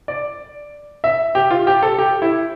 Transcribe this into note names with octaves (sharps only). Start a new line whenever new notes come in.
D5
E5
G4
F4
G4
A4
G4
E4